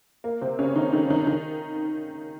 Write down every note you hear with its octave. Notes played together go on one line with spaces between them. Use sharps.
A#3
C3 C4
C#3 C#4
D#3 D#4
D#3 D#4
D#3 D#4
D#3 D#4